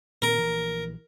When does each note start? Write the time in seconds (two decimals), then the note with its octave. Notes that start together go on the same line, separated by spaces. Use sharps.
0.22 A#2 D#3 C4 A#4
0.38 A#1 E3